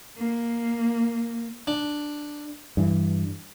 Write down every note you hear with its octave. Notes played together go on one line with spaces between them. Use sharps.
A#3
D4
G2 E3